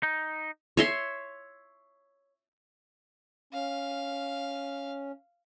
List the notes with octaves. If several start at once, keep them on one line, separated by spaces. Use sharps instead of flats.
D#4
C#5 E5 C6
C#4 F5